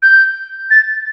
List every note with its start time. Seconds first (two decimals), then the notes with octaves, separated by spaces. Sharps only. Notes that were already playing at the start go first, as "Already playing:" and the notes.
0.02 G6
0.70 A6